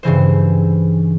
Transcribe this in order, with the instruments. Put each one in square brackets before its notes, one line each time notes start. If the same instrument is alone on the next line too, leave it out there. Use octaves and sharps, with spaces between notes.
[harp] G2 C#3 E3 C5